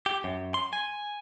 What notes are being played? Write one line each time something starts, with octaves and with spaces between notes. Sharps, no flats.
G4
F#2
C6
G#5